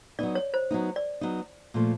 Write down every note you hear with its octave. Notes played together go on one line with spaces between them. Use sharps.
F#3 B3 D#4 D5
C#5
C5
F#3 B3 D#4
D5
F#3 B3 D#4
A#2 F3 A3